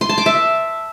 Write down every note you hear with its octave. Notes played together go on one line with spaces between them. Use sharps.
C6
A5
D6
E5